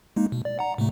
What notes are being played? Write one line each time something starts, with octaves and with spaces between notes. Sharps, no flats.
G#3 A#3 D#4
B2
D5
F#5 A#5
A2 C3 A3